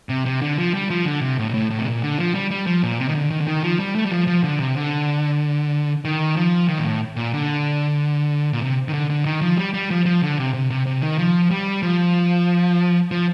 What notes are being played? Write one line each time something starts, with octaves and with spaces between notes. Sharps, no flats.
C3
C3
D3
F3
G3
F3
D3
C3
A2
A#2
A2
A2
C3
A#2
D3
F3
G3
G3
F3
A#2
C3
D#3
D3
D#3
D3
D#3
F3
G3
A3
G3
F3
F3
D3
C3
D3
D#3
F3
D#3
A#2
A2
A#2
D3
A#2
C3
D#3
D3
D3
D#3
F3
G3
G3
F3
F3
D3
C3
C3
C3
C3
D#3
F3
G3
F3
F3